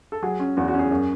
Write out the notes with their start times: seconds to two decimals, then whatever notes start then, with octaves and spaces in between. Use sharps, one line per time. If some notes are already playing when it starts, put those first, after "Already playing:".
0.12 A4
0.23 F#3 G#4
0.40 C#4
0.57 E2 F#4
0.68 F#4
0.74 C#4
0.79 G#4
0.91 F#2